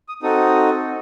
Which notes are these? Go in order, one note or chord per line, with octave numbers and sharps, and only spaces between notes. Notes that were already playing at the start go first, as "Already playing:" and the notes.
D#6
C4 D#4 F#4 A4 D#6